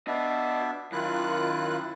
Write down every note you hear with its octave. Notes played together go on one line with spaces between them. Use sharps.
B3 D4 F#4 D#5 E5
F#2 D#3 F#3 E4 F4 F#6